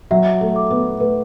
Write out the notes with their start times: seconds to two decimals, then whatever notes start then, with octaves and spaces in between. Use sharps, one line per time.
0.11 F#3 E5
0.41 A3
0.56 D6
0.70 B3
1.00 A3 B4